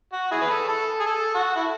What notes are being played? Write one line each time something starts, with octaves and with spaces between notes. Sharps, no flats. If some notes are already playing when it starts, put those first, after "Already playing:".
F#4
E4 G#4
B4
A4
A4
G#4
A4
F#4
E4